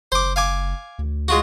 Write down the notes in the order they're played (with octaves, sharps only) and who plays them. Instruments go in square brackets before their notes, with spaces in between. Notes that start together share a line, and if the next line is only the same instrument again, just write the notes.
[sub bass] F#1 [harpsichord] C5 D6
[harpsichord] F5 G#5 D6
[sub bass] D2
[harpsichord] G#3 F4 F#4